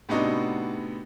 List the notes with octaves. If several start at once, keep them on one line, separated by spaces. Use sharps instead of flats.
A2 C3 B3 D4 D#4 F#4